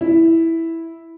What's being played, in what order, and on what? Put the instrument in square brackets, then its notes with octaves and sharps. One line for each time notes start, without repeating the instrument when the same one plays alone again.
[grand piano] E4